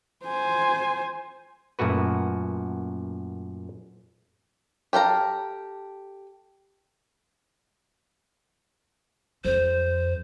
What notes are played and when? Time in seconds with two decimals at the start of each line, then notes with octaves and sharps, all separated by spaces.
0.24 C5 G#5
1.79 F#2 A#2 A3 F#4 B4
4.93 G4 A4 F5 A#5
9.45 F2 C5